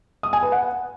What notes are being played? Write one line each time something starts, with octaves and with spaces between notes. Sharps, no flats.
D#6
G#5
B4
F#5